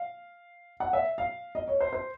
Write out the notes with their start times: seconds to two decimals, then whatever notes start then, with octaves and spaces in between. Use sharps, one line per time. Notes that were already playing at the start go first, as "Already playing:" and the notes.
Already playing: F5
0.80 F#5
0.93 E5
1.18 F5
1.55 D#5
1.68 C#5
1.80 C5
1.93 C5